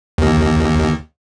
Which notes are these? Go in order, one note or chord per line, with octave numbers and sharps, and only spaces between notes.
D#2